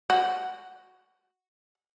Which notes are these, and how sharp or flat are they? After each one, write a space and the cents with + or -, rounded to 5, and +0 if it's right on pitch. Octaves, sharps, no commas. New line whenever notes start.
F#4 -5